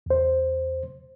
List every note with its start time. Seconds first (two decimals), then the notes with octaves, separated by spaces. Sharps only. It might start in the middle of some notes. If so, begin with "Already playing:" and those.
0.06 E2 C5